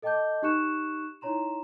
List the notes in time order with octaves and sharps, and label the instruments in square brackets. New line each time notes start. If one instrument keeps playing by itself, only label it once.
[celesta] A4 D#5 G5 A5 D6 G6
D#4 G4 C#6 F#6 C#7 E7
D#4 E4 C#5 A#5 C6 E7